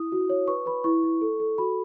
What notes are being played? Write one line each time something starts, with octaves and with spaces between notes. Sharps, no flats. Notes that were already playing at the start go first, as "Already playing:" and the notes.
Already playing: E4 D#6
F#4
C#5
B4 C#6
B4 B5
E4 C#6
E4
A4
A4
F#4 B5